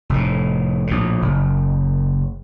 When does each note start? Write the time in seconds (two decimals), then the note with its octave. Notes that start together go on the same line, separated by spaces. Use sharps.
0.09 F1 A2
0.87 A#1 A2
1.22 F#1